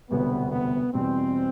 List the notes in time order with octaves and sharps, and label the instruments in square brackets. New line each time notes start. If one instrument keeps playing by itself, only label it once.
[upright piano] E1 D2 C3 G3 [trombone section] B3
[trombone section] B3
[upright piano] E2 B2 G3 [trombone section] C4